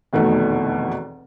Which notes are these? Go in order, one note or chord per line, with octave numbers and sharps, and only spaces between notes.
F1 E2 B2 D#3 A3